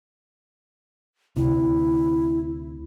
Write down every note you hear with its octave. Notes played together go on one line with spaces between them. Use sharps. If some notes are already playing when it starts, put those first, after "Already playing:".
D2 C3 E4